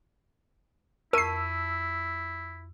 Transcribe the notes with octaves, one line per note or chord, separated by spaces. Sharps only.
F2 E4 A#4 A5 C#6 E6 C7 D#7